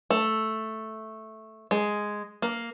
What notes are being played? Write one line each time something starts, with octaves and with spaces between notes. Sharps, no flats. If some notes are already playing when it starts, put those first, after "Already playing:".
A3
G#3
A#3